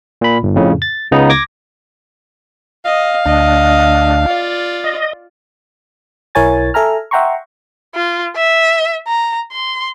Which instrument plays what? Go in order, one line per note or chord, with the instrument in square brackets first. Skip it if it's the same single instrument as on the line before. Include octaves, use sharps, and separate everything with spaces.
[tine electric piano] A#2 B5
G1
F2 A2 C#3
A6
C#2 C#3 B3 D#4 A#5
D6 G#6 A#6
[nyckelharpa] D#5 [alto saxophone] F5
[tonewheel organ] D2 D4 [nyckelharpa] D#5
[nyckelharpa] F4 D5
[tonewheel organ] D#5
[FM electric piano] B1 E4 A#4 C#5 G#5 A6
A4 E5 G#5 A#5 F6
E5 F#5 G5 A#5 C6 C#6
[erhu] F4
E5
A#5
C6